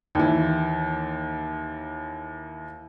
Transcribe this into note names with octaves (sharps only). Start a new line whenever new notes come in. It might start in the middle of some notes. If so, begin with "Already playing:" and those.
D#2 E3